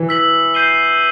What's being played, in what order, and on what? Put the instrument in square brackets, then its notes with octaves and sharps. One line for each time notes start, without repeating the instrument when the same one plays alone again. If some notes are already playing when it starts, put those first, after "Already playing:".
Already playing: [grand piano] E3
[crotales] E6 B6 F#7
G6 C7 D#7 G7